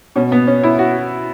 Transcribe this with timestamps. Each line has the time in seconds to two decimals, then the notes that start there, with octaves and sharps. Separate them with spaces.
0.16 B2 C#4
0.32 B3
0.47 C#4
0.63 E4
0.79 F#4